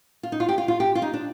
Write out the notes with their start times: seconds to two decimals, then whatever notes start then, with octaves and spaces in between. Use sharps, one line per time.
0.23 F4
0.32 D#4
0.40 F4
0.49 G4
0.58 F4
0.68 F4
0.80 G4
0.95 F4
1.02 D#4
1.14 D4